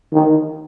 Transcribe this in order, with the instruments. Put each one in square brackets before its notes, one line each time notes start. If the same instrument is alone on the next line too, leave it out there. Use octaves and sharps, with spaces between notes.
[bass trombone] D#3